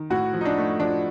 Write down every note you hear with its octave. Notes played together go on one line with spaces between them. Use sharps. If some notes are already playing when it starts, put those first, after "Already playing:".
Already playing: D#3
A2 F#4
F3
D#4
D4
A3
F3 D4